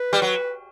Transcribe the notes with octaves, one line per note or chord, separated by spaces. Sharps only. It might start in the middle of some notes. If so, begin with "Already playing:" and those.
Already playing: B4
G3
F#3